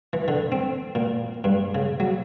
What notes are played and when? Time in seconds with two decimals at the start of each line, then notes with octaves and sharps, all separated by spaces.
0.13 E3
0.28 D3
0.52 C4
0.95 A#2
1.44 G2
1.75 C#3
2.00 F#3